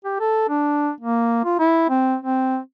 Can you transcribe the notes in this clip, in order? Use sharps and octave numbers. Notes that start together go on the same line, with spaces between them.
G4
A4
D4
A#3
F4
E4
C4
C4